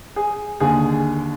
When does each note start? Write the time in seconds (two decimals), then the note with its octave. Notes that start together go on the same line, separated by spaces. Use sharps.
0.16 G#4
0.60 D#2 D3 G#4